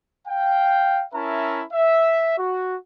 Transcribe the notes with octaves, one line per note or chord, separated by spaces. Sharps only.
F5 G5
C#4 E4 A#4 E5 A5
E5
F#4